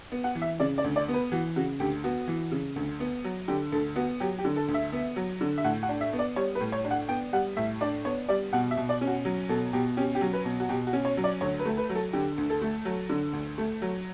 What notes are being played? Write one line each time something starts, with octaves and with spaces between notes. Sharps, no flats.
B3
F#5
E3
E5
C#3 D5
D5
D2
D5
B3
B4
E3 F#4
C#3 F#4
D2 G4
B3 F#4
E3
C#3
D2
B3
F#3
D3 G4
D2 A4
B3 F#4
F#3 G4
G4
D3
A4
D2
E5
B3
F#3
D3
E5
A2 F#5
F#5
D4
E5
B3
D5
G3 C#5
B4
A2
C#5
D4
F#5
B3 G5
G3 F#5
A2 E5
D4 D5
B3 C#5
G3 D5
B2 F#5
E5
B2
D5
C#4
F#4
F#3
B2 A4
B2 G4
C#4 G4
G4
F#3
B4
B2
F#4
B2 G4
F#4
C#4
C#5
F#3
D5
D2 C#5
B4
A3
B4
F#3
A4
D3 G4
D2
A4
A3
F#3
D3
D2
A3
F#3